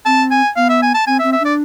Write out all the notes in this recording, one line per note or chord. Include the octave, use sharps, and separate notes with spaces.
C4 A5
G#5
B3 F5
E5
G#5
A5
C4 G#5
E5
C4
E5
D4 D5